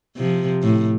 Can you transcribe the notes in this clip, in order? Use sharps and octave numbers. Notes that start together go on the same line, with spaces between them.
C3 F3
A2